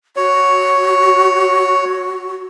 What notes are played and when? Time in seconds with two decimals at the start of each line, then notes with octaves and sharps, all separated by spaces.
0.17 F#4 C#5